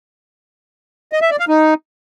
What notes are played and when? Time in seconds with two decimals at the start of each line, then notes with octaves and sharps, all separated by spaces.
1.12 D#5
1.21 E5
1.30 D5
1.39 F5
1.49 D#4